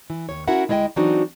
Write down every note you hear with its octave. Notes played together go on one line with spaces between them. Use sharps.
E3
D#2 C#5
C#4 E4 F#4 A#4 E5 F#5
D2 G#3 E4 D5 D#5 G5
E3 F#3 C4 D4 D#4 F#4